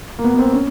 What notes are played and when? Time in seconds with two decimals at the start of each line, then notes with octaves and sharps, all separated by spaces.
0.19 A#3
0.24 B3
0.34 B3
0.39 C4
0.53 C#4